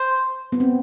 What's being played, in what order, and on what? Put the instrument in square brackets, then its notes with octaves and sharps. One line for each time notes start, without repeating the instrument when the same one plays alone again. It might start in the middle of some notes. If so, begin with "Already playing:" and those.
Already playing: [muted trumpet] C5
[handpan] B3
C4